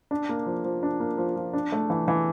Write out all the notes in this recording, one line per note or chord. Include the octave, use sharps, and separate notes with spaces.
D4
A#3
F3
F3
D4
A#3
F3
F3
D4
A3
E3
E3